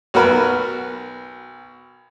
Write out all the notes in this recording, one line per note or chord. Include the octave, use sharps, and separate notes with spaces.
B1 F#4 A#4 B4